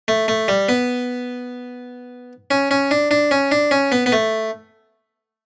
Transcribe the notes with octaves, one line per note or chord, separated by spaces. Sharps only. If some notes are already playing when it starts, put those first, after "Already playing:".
A3
A3
G3
B3
C#4
C#4
D4
D4
C#4
D4
C#4
B3
B3
A3